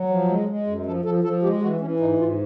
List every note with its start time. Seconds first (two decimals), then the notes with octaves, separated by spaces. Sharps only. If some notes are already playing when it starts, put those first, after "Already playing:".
Already playing: F#3
0.09 F3
0.28 G#3
0.48 G#3
0.67 F#2
0.86 F3 A4
1.05 F3 A4
1.23 F3 A4
1.42 G#3 G4
1.62 E3 F#4
1.81 E3 C#4
2.00 G#2 D#4
2.18 G#2 F4